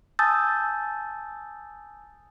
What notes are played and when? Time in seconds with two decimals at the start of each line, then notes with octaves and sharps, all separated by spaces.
0.19 G#5 A5 D#6 E6 G6 A6